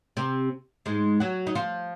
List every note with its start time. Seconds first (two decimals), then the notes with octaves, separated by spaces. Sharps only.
0.17 C3 C4
0.86 G#2 G#3
1.20 F#3 F#4
1.47 D#4
1.55 F3 F4